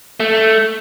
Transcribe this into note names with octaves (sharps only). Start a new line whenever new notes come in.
A3